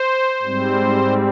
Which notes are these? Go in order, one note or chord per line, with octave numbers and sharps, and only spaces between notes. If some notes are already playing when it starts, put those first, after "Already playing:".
Already playing: C5
G#2 G3 C4